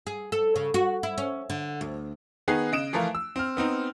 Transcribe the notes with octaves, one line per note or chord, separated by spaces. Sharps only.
G#4
A4
C#3
F#4
E4
C#4
D3
D2
D#3 B3 D#4 G#4 F#6 C7
C#3 D#5 D7 E7
E3 F3 A3 F4 A#4
E6
C4 F6
B3 C4 D#4